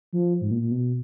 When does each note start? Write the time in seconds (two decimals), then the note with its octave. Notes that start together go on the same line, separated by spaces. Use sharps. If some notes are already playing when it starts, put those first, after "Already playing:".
0.13 F3
0.41 G#2
0.51 A#2
0.62 A#2
0.71 B2